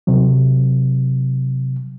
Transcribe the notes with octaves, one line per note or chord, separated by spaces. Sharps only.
C3 F#3